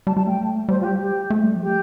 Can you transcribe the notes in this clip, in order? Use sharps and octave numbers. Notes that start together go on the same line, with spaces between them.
G3 A5
G3 A5
A3 G5
G3 C5
F4
G4
G4
A3
G3
F3
G4